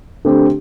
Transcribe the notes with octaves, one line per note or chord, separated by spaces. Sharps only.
D3 A3 C4 G4